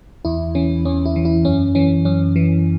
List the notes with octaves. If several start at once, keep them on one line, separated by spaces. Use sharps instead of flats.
E2 E4
E3 C#4
E2 C#4
E4
E3
E4
F#2 C#4
E3 C#4
F#2 C#4
E3